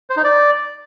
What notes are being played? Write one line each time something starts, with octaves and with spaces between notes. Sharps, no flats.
C5
D#4
D5